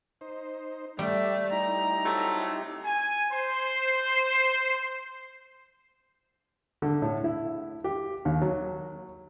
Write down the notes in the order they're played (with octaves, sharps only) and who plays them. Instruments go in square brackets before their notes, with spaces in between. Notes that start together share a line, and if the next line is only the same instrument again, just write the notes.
[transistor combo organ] D#4 C5
[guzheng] G3 [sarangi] A3 [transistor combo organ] G4
[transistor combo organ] D#4 E4 G4 [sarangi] A#5
[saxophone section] C3 F#3 A3
[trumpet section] G#5
C5
[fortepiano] D3
A2
E4
G4
D#2
F#3